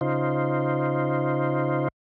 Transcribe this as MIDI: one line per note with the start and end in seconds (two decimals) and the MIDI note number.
0.01 1.88 49
0.01 1.88 63
0.01 1.88 65
0.01 1.88 72